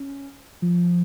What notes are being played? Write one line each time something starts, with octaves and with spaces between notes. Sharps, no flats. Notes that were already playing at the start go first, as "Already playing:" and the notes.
Already playing: C#4
F3